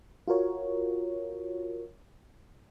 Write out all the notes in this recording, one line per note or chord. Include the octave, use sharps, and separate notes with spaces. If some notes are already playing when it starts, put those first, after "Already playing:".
F4 F#4 A#4 C#5